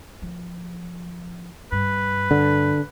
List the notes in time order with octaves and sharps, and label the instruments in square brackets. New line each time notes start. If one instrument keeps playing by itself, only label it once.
[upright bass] F3
[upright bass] G2 [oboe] B4
[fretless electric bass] D3